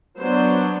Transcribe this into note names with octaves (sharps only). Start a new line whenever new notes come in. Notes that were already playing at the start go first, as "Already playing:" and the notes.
F#3 B3 D4 C5